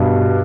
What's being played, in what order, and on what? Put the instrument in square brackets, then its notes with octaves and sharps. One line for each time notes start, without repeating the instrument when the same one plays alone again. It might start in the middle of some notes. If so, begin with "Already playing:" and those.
Already playing: [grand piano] G2 B2